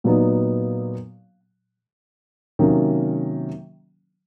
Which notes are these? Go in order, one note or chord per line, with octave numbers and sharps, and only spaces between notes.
A#2 F#3 B3 D#4
C3 D#3 F#3 A#3 C#4